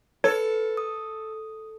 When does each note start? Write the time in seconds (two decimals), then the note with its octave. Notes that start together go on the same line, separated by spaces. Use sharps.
0.24 A4 B4 C#5
0.77 D#6